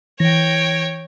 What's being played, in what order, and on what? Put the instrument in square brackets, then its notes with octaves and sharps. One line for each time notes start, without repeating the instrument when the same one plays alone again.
[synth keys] E3 A#6 [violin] C#5 G5